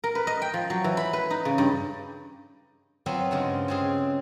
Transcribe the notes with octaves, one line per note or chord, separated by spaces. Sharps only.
A#4
B4
D#5
G5
F3
F#3
E3
B5
B4
D#4
C#3
G2
F#3 B3 C4 F4
G2 C#3 G#3
C#3 C4 G#4